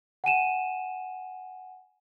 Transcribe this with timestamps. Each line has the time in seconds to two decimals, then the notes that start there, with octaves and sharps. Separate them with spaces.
0.24 F#5 G#5 D#7 E7